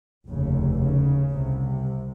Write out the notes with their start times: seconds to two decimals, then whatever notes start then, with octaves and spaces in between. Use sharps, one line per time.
0.27 F1 D#2 C#3
0.79 C#3
1.32 C2 C3